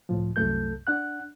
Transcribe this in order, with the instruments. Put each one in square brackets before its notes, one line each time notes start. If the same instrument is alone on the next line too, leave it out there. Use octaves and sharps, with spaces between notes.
[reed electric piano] C#2 A2 F3
C2 F#2 A3 A4 G6
D4 F#5 F#6